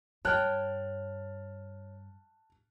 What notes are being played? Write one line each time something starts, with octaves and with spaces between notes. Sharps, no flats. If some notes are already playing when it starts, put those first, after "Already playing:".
G2 C#5 G5 A5 F6 F#6